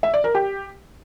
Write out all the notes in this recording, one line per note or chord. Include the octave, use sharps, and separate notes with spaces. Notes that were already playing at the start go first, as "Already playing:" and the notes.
E5
D5
A#4
G4